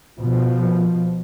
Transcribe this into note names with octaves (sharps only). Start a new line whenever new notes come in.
B2 F3